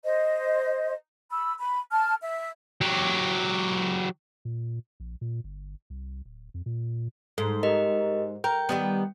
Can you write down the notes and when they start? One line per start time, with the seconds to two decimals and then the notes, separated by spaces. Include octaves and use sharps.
0.04 C5 D#5
1.31 B5 E6
1.57 B5
1.91 A5 F6
2.21 E5
2.81 F#3 G4
4.45 A#2
5.00 A#1
5.21 A#2
5.44 G1
5.90 C2
6.25 D1
6.54 F2
6.66 A#2
7.38 G#2 A4
7.63 G4 A#4 D#5
8.44 A#4 G5 G6
8.69 D#3 G3 B3